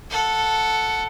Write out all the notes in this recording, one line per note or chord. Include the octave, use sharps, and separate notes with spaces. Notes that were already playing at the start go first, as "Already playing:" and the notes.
A4 F#5